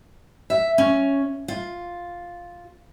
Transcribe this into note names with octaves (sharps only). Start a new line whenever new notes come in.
E5
C#4
F4